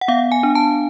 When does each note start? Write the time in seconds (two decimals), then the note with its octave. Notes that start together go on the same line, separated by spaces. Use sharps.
0.01 F#5
0.08 B3 F5
0.32 G#5
0.43 D4
0.55 A5